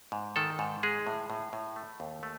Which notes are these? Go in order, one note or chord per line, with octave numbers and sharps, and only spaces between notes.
G#2
D#3 A4
G#2
G#3 G#4
A2
A2
A2
A3
D#2
A3